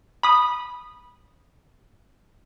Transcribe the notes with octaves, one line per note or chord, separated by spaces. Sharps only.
B5 D#6